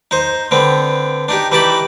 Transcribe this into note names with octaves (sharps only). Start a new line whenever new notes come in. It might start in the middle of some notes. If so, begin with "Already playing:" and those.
D#4 C5
D3 B3 C4
D4 D#4 G4
E3 D#4 G4 A5 B5